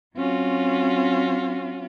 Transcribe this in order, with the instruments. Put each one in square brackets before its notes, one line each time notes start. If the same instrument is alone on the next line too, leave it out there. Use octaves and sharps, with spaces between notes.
[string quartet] F#3 C4 C#4 F4 F#4